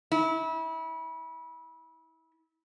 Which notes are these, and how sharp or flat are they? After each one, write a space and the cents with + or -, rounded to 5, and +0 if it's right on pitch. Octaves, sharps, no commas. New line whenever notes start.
E4 -30